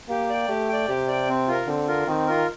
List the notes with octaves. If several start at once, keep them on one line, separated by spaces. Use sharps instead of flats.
A#3 G4
D5 G5
A3 G4
D5 G5
C3 G4
D5 G5
C4
F4 A#4
D3 C4
F4 A#4
D#3 C4
F4 A#4